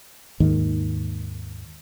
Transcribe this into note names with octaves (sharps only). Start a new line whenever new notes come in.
D#2 G#2 D#3